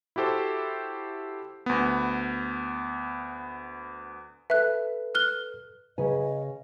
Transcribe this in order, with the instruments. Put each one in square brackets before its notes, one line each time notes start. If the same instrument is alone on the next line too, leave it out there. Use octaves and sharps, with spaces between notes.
[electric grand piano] E4 F#4 G4 A4 C5
D2 B3
[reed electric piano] A4 B4 [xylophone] E5 F#6
[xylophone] F6 F#6 G7
[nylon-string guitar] C#3 B4 G#5 [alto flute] D#5